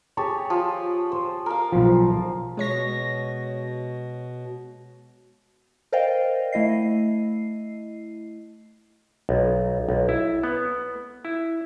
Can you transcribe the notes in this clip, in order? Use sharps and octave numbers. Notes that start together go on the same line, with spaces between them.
G4 G#4 C#5 A5
F3
C5
A#4 F5
B1 F3
B2 G#3 C#5 A#6
A#4 C5 D5 D#5 F5 G5
A3 E4 D#5 C7
B1
B1
E4
B3
E4